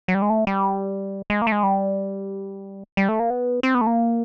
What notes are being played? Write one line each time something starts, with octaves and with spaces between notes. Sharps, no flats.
F#3
G3
G#3
A3
G3
G#3
A#3
A3
G#3
G3
G3
A3
A#3
B3
C4
B3
A3
A#3